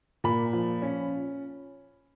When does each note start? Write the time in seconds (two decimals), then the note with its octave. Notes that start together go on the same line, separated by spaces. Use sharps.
0.24 A#2 B5
0.53 F3
0.82 C#4